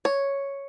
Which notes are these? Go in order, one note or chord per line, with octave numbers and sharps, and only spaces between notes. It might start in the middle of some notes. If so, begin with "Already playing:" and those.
C#5